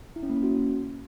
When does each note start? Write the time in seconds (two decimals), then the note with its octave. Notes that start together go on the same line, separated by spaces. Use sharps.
0.16 E4
0.23 C#4
0.30 A#3
0.36 C#4
0.43 F#4